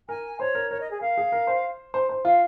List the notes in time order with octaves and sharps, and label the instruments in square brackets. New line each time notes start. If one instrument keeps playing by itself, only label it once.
[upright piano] A#4 [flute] G#5
[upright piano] C5 [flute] C#5
[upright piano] A#4
[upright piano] A#4 [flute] C#5
[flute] D#5
G#4
[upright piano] A#4 [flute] F5
[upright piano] G#4
A#4
C5
C5
C5
[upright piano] F4 [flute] F5